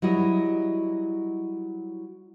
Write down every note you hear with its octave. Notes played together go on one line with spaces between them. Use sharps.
F#3 G3 E4 D#5